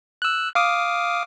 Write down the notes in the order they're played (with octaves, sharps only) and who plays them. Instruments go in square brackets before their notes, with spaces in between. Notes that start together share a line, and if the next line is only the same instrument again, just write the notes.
[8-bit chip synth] E6 F#6
F5 D6 D#6